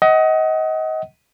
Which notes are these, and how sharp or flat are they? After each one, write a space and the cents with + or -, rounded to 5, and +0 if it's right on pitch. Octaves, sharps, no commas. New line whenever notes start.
D#5 +25 F#5 +25